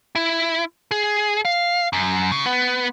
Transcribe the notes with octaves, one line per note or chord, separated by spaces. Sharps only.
E4
G#4
F5
F#2
C#3
B3